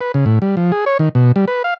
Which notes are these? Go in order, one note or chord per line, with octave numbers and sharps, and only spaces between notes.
B4
C#3
A2
G3
F3
G#4
C#5
D#3
B2
G3
B4
F5